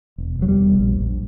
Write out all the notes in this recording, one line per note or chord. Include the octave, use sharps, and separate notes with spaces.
E1
E1 F#3
G3
E1
A#1
A#1